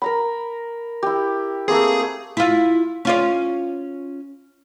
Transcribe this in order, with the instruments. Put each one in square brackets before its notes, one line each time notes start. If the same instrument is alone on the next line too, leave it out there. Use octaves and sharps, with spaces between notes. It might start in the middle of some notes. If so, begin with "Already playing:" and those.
[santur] A#4 A#5 B5
E4 G4
[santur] A3 A#3 C4 [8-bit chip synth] G#4
[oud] E4 F4
C#4 F4 D5